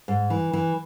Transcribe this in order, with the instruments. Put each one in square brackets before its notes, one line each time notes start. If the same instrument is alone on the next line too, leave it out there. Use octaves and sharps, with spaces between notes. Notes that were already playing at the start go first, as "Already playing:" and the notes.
[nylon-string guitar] G#2
E3
E3